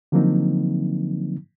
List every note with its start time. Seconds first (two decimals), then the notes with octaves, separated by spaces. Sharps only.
0.12 D3 F3 F#3 A#3 C4 D#4